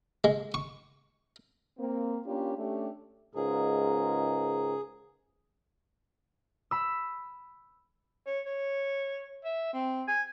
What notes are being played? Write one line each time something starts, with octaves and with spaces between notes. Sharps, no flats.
G#3
C#6
A#3 C4
A#3 C#4 D4 F4 G4
A3 C#4 D4 G4
C#2 G#2 G#4 A#4
B5 E6
C#5
C#5
E5
C4
G#5